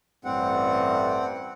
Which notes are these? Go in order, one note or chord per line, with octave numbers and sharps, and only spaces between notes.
A1 G2 A3 C4 F#5